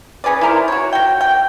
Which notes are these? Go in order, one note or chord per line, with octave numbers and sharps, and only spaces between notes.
C#4 G#4 B4 D5
E4 A#4 C5
F#4 C#5
F#4 G5
G5